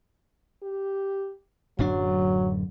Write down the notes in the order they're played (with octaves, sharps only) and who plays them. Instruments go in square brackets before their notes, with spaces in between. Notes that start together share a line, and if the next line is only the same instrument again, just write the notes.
[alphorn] G4
[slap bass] D1 F#2 D4 [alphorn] F#3